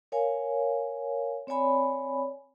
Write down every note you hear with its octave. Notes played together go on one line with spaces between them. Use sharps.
A#4 C#5 F5 G#5
C4 C#5 D5 G#5 B5